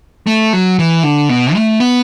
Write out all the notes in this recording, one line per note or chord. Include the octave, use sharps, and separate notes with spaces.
A3
F#3
E3
D3
B2
A3
B3